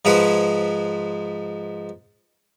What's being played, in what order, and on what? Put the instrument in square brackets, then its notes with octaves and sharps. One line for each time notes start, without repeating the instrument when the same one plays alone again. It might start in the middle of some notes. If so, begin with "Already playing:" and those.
[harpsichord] G#2 F3 G#3 B4 C5